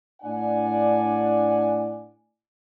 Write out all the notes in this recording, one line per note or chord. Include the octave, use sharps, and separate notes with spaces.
A2 D4 D5 F#5 G#5